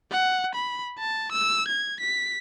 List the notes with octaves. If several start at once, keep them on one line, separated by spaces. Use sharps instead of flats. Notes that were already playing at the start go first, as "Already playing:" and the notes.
F#5
B5
A5
E6
G#6
B6